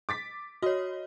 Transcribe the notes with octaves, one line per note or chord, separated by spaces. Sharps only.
D6 A6 B6
F#4 C#5 D#5